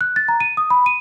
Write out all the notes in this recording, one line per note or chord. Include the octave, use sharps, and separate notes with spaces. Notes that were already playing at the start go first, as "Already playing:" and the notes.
F#6
A6
A#5
D#7
D#6
B5
D#7